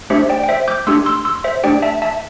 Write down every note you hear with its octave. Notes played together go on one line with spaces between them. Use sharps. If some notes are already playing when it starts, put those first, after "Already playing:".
A3 D4 G4 C5 E5
D5 G5
G5
C5 E5
D6 G6
A3 D4 G4 C6 E6
C6 E6
C6 E6
C5 E5
A3 D4 G4 D5 G5
E5 A5
E5 A5